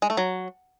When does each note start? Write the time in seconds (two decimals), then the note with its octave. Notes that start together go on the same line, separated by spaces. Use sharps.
0.02 G#3
0.10 A3
0.17 F#3